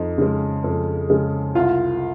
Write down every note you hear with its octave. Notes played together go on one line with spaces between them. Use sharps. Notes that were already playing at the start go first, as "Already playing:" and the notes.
Already playing: F2 D#4
C#3 G#3
F2
C#3 G#3
C2 F4